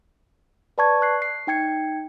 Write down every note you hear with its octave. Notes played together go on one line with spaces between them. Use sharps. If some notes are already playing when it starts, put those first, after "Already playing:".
B4 D5 A5 C#6 G#6
F#6 C7
C7
D#4 G5 G#6 C#7